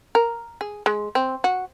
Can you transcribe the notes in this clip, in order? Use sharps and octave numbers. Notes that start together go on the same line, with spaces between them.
A#4
G#4
G#3
C4
F#4